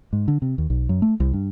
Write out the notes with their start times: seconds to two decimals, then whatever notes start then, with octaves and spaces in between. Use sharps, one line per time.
0.13 G#2
0.28 D3
0.42 C3
0.58 D#2
0.70 B1
0.89 F#2
1.02 A3
1.20 C2
1.33 G2